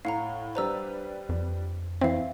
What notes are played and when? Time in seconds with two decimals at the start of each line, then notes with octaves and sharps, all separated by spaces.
0.05 A2 F5 F#5 A#5
0.55 G3 D4 B4 C5 A#5 E6
1.29 F2
2.01 E3 C4 E5 F5